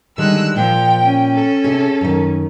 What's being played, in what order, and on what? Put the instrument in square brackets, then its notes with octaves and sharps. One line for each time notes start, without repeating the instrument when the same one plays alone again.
[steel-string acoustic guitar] D3 D#3 G3 [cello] G#3 [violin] E6 F#6
[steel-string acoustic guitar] A#2 [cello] F3 [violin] G5
[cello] C#4
[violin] A4
[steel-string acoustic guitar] C3 G#4
F#2 D#3